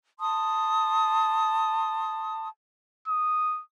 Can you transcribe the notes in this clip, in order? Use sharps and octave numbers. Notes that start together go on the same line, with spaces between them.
A5 C6 D#6
D#6